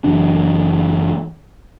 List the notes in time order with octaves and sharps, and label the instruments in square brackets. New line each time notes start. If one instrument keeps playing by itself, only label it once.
[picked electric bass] F#1 E3 F#3 D4